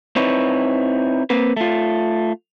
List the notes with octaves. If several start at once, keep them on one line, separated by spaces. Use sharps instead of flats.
C4 D#4 E4 B4 C#5
A#3 C4 B4
A3 F4